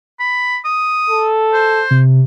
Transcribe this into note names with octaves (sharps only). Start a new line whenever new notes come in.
B5
D#6
A4
C5
C3